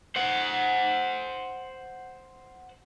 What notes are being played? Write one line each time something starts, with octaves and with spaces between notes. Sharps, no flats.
C5 F#5